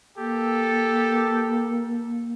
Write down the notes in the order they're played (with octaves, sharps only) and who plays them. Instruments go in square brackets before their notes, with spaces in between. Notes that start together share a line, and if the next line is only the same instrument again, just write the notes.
[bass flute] A#3 [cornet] G4 [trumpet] A4